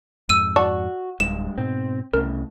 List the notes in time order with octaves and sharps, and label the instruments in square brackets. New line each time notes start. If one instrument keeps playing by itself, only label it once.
[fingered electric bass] F2 G#2 [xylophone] E6 D#7
[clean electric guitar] F#4 [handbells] D5 A5 C#6
[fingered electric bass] D1 [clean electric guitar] G2 G#3 [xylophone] E7
[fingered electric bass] G#2 B2 [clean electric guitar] C4
[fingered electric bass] C2 [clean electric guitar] A2 C#3 [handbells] A#4